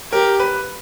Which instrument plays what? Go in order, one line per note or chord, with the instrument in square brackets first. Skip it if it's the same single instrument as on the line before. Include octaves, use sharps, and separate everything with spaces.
[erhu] G4 [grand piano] A#4
[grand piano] B4